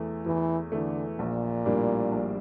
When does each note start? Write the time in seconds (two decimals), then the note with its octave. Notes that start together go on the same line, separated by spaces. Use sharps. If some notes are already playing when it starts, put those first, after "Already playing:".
Already playing: E2 E3 A3
0.26 E2 E3
0.72 D3 E3 A3
1.19 A#1 A#2
1.65 A2 G3 A#3 D4
2.12 A#1